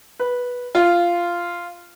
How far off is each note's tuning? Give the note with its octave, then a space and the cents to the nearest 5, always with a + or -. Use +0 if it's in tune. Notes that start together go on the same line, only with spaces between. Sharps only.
B4 -10
F4 -10